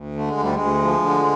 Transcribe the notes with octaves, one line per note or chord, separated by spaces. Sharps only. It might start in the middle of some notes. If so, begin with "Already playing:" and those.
Already playing: D2
D3 A3
G#3
D2 G3
D2 G#3
F3
D3